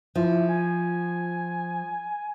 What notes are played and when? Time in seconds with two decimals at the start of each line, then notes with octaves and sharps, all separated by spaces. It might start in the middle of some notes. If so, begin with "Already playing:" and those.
0.15 F3 E4
0.49 G#5